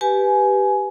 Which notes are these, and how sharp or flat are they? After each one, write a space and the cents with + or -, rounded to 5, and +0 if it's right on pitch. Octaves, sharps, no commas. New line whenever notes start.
G4 +0 B4 +0 G#5 +20